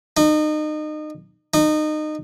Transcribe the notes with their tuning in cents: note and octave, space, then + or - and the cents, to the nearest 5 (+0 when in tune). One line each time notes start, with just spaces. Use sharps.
D#4 -30
D#4 -25